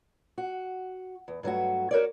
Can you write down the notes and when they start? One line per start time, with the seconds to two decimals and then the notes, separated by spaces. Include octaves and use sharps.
0.38 F#4
1.28 E2
1.43 G2 F#3 A3 F#4
1.91 F#4 A#4 C#5 D5